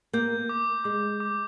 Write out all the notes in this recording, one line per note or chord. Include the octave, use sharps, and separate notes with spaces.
A#3 G6
D6
G#3 D6
D6